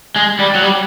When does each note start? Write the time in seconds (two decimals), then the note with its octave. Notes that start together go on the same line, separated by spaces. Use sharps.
0.16 G#3
0.39 G3
0.55 F#3
0.63 G3